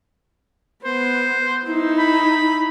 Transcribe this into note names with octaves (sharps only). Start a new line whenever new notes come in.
B3 C5
D#4 E4
B5